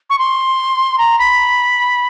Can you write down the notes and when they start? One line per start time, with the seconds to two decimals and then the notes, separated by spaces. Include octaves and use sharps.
0.10 C#6
0.19 C6
0.98 A#5
1.19 B5